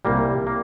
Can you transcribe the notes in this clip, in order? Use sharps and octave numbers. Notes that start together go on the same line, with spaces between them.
C2 A#2 G3 A#3
A#3